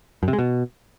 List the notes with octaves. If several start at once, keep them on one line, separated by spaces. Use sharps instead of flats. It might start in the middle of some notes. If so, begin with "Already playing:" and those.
F#2
C3
G#3
B2